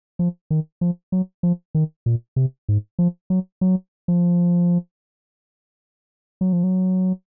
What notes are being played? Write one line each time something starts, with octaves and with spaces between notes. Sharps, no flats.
F3
D#3
F3
F#3
F3
D#3
A#2
C3
G#2
F3
F#3
F#3
F3
F#3
F3
F#3